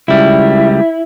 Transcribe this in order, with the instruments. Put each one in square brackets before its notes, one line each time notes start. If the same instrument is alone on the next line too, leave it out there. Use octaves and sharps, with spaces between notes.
[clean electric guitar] C#2 G3 [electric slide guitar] E4